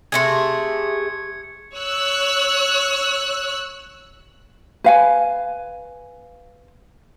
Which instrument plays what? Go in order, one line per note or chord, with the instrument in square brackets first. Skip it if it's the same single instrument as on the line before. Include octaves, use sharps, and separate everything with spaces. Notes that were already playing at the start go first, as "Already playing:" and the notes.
[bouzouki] C3 A3 G#4 [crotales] G#6 C#7
[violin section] C#5 E6 F#6
[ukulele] B4 F5 G#5